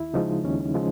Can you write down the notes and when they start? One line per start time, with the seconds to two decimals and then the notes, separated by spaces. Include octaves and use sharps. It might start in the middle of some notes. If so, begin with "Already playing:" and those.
Already playing: D#2 E4
0.14 C#3 F3 G#3 D#4
0.44 D#2 C#4
0.74 C#3 F3 G#3